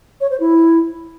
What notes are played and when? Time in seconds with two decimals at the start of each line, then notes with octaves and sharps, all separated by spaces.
0.21 C#5
0.30 C5
0.40 E4